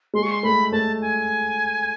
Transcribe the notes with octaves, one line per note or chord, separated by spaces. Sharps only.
G#3 C6
C#6
C6
A3 B5
A3 A5
G#5